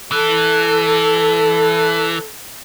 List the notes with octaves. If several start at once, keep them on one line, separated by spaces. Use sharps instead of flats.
E3 A4